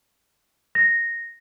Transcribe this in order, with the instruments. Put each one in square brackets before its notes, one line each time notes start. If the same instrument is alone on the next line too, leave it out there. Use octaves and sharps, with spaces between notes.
[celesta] A#6